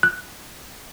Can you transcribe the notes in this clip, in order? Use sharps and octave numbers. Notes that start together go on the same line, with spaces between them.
F#6